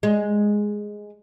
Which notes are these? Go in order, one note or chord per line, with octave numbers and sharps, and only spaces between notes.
G#3